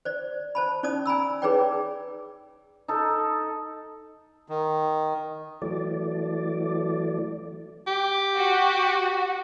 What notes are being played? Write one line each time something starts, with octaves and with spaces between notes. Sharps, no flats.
C5 D5
C5 A5 B5
C#4 D#4 D5 A5 D#6
G#5 A#5 B5 E6
D#4 G#4 B4 C#5 D5 G5
D#4 A4
D#3
E3 F#3 A3 D5
G4
F#4